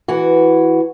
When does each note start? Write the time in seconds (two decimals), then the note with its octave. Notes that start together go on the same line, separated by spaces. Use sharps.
0.08 E3 F#4